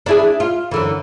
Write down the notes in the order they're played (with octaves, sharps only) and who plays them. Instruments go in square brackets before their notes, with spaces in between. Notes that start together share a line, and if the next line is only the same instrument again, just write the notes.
[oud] D4 E4 G#4
F4
F#2 D3 E3